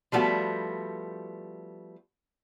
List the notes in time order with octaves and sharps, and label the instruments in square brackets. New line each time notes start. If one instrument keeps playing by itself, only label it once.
[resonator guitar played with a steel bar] F3 G3 A3 B3 F#4